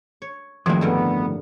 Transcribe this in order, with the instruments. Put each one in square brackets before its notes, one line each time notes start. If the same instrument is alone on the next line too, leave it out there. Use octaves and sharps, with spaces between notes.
[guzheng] C#5
[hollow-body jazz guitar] F2 A2 [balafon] D#3 F3 [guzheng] F#3 G#3 A#3
[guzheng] G2 D3 A#4 [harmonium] B3